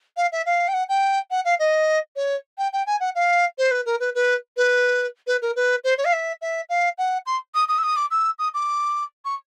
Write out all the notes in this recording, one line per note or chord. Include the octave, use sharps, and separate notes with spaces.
F5
E5
F5
G5
F#5
G5
F#5
F5
D#5
C#5
G5
G5
G#5
F#5
F5
C5
B4
A#4
B4
B4
B4
B4
A#4
B4
C5
C#5
F5
E5
E5
F5
F#5
C6
D#6
D#6
E6
D#6
D6
E6
D#6
D6
C#6